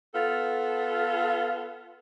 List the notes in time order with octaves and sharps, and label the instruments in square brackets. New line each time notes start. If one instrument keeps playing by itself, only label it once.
[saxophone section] B3 F4 A4